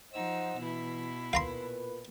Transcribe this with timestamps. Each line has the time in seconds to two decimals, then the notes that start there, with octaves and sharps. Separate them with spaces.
0.13 F3 D#4 C5 D#5 F#5 E6
0.58 B2 E3 E4
1.33 A#2 B4 F5 A#5 C6